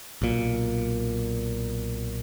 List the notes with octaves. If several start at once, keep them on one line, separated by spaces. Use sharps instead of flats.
B1 A#2